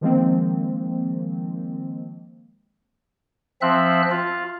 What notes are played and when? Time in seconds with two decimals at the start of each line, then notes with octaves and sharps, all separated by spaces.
0.01 D#3 F3 G#3 A#3 C4
3.62 F3 C4 E5 F#6
4.11 F4